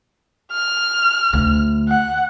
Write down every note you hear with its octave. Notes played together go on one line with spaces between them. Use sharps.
F6
D2
F#5